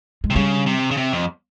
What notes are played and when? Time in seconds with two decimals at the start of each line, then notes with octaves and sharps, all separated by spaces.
0.24 G#3
0.30 C3
0.36 C#3 G3
0.66 C3
0.91 C#3
0.97 C3
1.12 F2